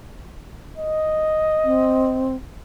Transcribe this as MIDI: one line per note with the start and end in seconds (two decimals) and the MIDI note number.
0.78 2.32 75
1.64 2.36 60